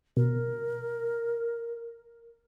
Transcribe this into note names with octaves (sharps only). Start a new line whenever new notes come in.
B2 A#4